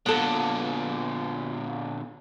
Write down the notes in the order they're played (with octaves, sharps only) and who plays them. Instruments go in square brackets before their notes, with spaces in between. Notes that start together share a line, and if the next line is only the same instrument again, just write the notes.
[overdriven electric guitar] A#2 D3 [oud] B3 A4